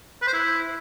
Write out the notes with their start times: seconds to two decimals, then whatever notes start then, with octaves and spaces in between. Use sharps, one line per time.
0.22 B4
0.27 C5
0.33 E4